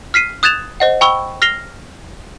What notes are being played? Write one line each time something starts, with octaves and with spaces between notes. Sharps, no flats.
F6 B6 C7 D#7
D#6 F#6 G#6 A6 E7 F7
C5 D#5 F#5
G5 B5 C#6 E6 G7
F6 A#6 C7 F7 G7